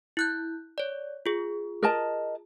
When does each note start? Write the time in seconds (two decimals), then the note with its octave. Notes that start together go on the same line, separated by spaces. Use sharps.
0.17 E4 F#6 G6
0.78 C#5 D5
1.26 F4 G#4
1.83 A#4 D#5 A5